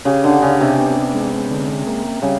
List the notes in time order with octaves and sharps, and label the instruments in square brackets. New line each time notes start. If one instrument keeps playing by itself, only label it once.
[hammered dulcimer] C#3 [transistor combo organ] G4
[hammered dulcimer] D3
[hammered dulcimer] C#3 [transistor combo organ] D4
[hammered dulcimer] C3
[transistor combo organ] B3
G#3
D3
A#3
[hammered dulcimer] C#3 [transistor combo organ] G3